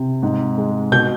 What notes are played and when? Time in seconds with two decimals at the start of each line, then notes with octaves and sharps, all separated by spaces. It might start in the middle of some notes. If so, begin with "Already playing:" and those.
Already playing: C3
0.23 G#2
0.58 G#3
0.92 B2 G6